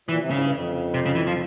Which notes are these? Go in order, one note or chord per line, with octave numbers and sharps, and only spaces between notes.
A#2 E3
C3
G#2 C#3
G2
F2
C3
C#3
E3
F3